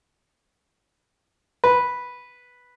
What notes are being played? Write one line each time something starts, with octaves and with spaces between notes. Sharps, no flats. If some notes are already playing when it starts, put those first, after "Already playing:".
B4